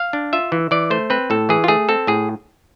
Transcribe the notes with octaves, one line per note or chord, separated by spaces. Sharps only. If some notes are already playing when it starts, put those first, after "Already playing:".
Already playing: F5
D4
F4 E5
E3
E3 D5
A3 C5
C4 B4
A2 A4
E3 G#4
F4
A3 G#4
C4 A4
A2 G#4